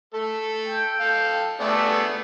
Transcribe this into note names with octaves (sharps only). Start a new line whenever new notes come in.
A3 A4
G5
A4 F5
A3 B3 D4 G#4